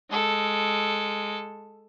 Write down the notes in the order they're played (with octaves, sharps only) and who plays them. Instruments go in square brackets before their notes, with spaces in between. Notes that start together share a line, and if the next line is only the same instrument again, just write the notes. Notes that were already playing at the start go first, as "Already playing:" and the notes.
[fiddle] G#3 A4